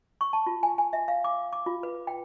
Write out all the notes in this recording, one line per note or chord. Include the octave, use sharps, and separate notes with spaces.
C#6
A5
F4
G#5
G#5
E5
F5
D6
D6
F4
B4
G5